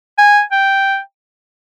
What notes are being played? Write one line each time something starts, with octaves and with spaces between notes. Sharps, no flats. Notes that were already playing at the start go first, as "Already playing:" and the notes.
G#5
G5